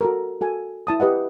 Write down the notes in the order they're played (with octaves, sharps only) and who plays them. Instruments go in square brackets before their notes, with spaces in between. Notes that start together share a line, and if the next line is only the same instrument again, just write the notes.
[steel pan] F#4 A4 A#4
F#4 A4 G#5
E4 A5 D#6
G4 B4 D#5 F#5